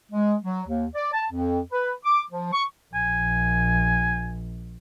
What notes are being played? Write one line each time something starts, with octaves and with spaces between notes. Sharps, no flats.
G#3
F#3
D#2
D5
A5
F2
B4
D6
F3
C#6
A#1 G#5